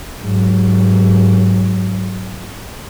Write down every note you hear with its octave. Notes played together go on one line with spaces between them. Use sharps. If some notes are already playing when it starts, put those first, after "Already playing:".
G#2 F#3